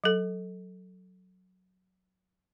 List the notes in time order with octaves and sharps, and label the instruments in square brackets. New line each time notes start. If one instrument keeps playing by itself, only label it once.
[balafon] F#3 A4